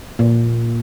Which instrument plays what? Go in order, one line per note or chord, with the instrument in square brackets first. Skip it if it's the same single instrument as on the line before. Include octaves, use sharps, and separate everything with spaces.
[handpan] A#2